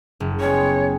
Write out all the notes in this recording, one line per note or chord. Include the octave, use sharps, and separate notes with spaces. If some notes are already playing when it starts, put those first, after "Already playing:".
F#1
G3 G#3 B3 C#5